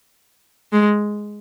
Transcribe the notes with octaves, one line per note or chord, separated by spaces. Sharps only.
G#3